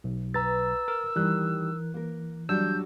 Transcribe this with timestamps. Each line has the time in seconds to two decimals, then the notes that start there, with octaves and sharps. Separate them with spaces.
0.04 B1
0.34 B4 A#5 E6 A6
0.88 A#4
1.16 D#3 E3 G3 F#6
1.94 A#3 A#4
2.49 F#3 G3 D4 E6 G6